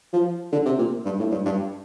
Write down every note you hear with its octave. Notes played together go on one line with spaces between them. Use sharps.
F3
D3
C3
A#2
G2
A2
G2
G2